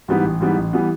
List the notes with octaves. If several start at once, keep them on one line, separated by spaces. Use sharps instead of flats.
G#2 E3 G3 B3
A1
G#2 E3 G3 B3
A1
E3 G3 B3